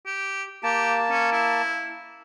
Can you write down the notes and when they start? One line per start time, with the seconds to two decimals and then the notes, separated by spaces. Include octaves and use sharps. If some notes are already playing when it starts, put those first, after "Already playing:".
0.06 G4
0.63 A#3 G4 A5
1.10 C#4
1.32 E4